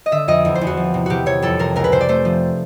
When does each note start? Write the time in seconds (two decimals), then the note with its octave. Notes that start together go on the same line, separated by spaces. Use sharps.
0.06 D#5
0.12 D3 E5
0.28 F2 D#5
0.45 E2
0.55 C5
0.61 E2
0.67 F#4
0.77 F3
0.94 C3
1.06 C3 F#4 G4
1.26 C3 C#5
1.42 F2 A4
1.59 C3 A#4
1.76 C#2 A#4
1.84 B4
1.92 C3 C5
2.01 D5
2.09 A3 C5
2.25 F3